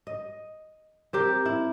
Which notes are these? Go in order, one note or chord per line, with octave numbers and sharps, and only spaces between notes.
D#5
C4 G4 A#4
E4